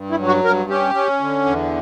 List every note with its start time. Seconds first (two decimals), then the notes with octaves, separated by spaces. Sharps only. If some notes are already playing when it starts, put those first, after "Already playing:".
Already playing: G2
0.11 E4
0.19 F#3
0.27 F#4
0.44 G2 A#4
0.70 C#4 G4
0.95 C#4
1.20 D3
1.46 E2